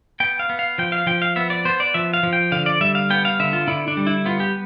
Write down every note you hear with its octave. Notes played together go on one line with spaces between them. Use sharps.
B3 G5
F5
B3
F5
F3 G5
F5
F3 G5
F5
B3 E5
D5
B3 C5
D5
F3 E5
F5
F3
G5
D3 F5
D5
G3 E5
F5
B3 G5
F5
D3 E5
F4
D3 E4
D4
G3
E4
B3 F4
G4